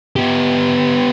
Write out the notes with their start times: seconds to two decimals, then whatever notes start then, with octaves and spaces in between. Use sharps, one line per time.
0.16 B3 G4